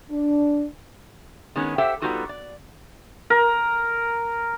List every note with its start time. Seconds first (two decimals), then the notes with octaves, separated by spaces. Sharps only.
0.10 D4
1.56 D#3 G#3 B3 C#4
1.78 G4 A4 C5 E5 F#5 G5
2.02 G3 B3 D#4 F4 F#4 A4
2.29 D5
3.30 A#4